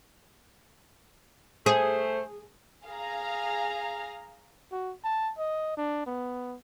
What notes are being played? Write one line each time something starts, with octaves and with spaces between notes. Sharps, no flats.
A3 G#4 C5
G#4 F5 A#5
F#4
A5
D#5
D4
B3